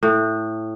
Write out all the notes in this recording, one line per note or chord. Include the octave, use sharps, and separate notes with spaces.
A2